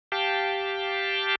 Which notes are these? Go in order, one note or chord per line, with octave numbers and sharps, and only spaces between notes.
G4 F5 G5 A5